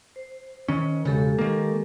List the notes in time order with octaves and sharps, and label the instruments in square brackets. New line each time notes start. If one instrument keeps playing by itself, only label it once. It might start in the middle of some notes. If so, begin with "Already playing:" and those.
[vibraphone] C5
[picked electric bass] D#3 C#4
[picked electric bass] E1 C#3 [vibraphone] G#3 G4 A4
[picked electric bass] D#3 A#3